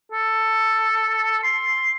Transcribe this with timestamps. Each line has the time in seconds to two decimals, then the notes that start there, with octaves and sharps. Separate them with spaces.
0.12 A4
1.43 C6